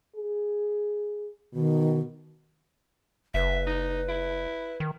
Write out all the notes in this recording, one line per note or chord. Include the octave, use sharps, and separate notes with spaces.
G#4
B2 D#3
F#1 B4 E5
D#4
E4
D#3